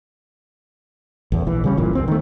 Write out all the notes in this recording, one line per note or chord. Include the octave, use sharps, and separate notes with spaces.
A1 E2
A#1 E3
C#3 G3 C#4
D1 G1 A#2 E3
C2 G2 C4
D#3 A3